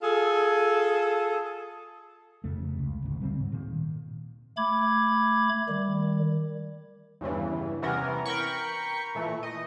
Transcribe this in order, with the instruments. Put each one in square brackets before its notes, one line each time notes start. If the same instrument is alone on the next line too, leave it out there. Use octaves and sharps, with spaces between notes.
[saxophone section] F4 G#4 A4
[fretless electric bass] F1 F2 C#3 A3
C#2
G#1 D2
C#3 G3 A#3 C4
G#2
A#2 D#3
[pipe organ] A3 B5 D6 G#6
D#3 G3
[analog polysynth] E2 G2 C#3 E3
C3 E3 B3 C#4 A#4
A#4 G5 B5 C#6
A#2 E3 A3
D#5